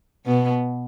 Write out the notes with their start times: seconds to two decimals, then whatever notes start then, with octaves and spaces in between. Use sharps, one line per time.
0.26 B2 B3